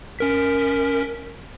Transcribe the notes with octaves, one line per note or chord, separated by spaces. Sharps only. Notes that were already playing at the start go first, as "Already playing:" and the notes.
C#4 A#4 B6